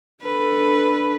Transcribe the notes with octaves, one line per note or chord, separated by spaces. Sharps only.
D4 A4 B4